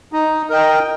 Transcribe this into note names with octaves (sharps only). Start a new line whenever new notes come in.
D#4
A#4 D#5 G5